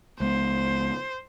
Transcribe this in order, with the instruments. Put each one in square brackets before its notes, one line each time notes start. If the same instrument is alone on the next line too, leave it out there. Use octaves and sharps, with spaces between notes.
[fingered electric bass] C#2 G#3 B3 [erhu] C5